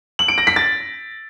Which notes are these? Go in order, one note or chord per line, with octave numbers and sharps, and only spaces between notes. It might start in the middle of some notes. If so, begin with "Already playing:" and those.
F#7
D7
A#6
B6
A6